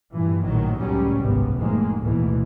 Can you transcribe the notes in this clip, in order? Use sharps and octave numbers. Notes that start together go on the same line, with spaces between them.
G2 A#2 E3
A#1 A2 D#3 F#3
C#2 F#2 A2 F#3 G3 C#4
G#1 C#2 F#2 C3 B3
F1 F2 A2 D#3 G#3 A#3
D2 G#2 B2 E3